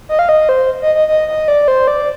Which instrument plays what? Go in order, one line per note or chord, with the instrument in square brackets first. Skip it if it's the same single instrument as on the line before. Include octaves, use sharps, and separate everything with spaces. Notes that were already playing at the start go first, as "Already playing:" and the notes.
[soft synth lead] D#5
F5
D#5
C5
D#5
D#5
D#5
D#5
D5
C5
D5